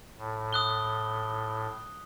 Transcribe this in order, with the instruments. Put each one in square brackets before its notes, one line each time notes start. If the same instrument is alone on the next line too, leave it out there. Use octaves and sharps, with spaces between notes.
[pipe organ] A2
[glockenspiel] D#6 F#6 G7